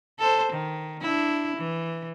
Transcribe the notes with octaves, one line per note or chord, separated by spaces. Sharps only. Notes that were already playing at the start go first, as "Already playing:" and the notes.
A4 C5
D#3
D4 E4
E3